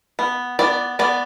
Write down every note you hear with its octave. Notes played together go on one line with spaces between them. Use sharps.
B3
B3 D5
B3 D5